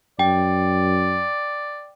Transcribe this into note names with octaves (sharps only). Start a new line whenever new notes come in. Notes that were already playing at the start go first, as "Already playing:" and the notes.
F#2 D5 G5